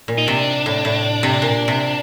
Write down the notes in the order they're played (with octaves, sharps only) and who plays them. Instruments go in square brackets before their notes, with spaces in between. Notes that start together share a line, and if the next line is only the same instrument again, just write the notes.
[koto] A#2
[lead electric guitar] D#4
[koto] C3 [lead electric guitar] D4
[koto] A2
A2
C3
A#2
C3